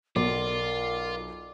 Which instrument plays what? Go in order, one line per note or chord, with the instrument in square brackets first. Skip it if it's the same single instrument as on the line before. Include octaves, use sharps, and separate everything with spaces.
[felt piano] B1 [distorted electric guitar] F4 [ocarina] A#4 [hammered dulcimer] D5